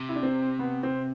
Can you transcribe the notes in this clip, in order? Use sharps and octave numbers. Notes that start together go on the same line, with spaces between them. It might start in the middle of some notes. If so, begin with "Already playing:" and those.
Already playing: C3
E4
D4
C4
B3
C4